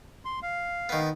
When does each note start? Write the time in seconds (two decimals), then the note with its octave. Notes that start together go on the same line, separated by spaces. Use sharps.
0.25 C6
0.42 F5
0.89 D#3 B3